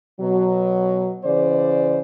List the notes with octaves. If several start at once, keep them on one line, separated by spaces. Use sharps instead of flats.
B2 F#3
C#3 E3 C5 D5